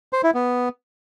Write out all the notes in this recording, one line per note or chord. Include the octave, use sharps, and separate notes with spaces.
C5
E4
B3